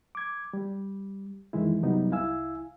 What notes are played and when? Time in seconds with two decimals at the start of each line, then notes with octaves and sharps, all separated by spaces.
0.15 D6 G#6
0.53 G3
1.53 F2 D#3 E3 G#3 E4
1.83 F#2 C3 F#3 G3 B3 D#4
2.11 C2 E4 F5 G#5 E6